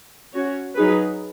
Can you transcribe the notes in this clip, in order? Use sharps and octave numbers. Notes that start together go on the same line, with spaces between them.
C#4 F#4 C#5
F#3 D#4 G#4 B4